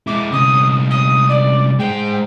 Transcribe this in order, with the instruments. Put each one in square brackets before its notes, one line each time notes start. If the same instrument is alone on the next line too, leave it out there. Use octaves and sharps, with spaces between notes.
[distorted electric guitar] G#3 E4 [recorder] D6
[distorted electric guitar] C2 C#4 [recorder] D#6
[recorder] D#6
D5
[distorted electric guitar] G#3 C5 [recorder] G5